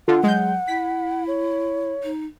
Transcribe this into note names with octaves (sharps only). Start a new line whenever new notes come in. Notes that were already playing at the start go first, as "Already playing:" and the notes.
D3 F4 F#5
F#3 G#3 G6
E4 B6
C#5
D#4